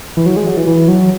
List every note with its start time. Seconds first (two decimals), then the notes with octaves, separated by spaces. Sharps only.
0.17 E3
0.26 F#3
0.37 G#3
0.47 F#3
0.57 E3
0.67 E3
0.88 F#3